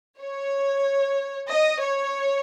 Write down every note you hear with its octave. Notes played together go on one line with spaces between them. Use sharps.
C#5
D#5
C#5